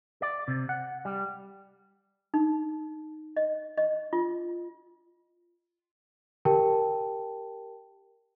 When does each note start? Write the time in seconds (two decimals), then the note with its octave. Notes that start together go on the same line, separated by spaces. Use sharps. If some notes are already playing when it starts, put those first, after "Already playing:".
0.22 D5
0.48 C3
0.69 F#5
1.05 G3
2.34 D#4
3.37 D#5
3.77 D#5
4.13 F4
6.45 G4 A#4 G5 A5